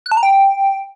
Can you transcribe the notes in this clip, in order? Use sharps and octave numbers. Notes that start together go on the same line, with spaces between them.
F#6
A5
A#5
G5